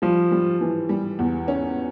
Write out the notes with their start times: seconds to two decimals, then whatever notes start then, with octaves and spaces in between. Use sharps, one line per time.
0.02 F3 G3
0.32 G3
0.61 E3
0.89 G3
1.19 E2
1.48 C#4